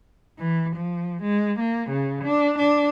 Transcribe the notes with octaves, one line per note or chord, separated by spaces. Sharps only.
E3
F3
G#3
A#3
C#3
D4
D4